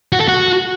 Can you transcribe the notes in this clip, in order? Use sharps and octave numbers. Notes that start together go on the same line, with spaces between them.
F#4
A4
F#4